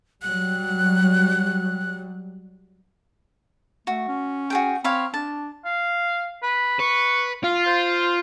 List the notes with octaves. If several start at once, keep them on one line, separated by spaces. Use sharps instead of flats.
F#3 G3 F#6
A3 F#4
C#4
F#4 G#4 G5
C4 C#5 F5 B5
D4 A5
F5
B4
B4 C#6
F4 F5
C5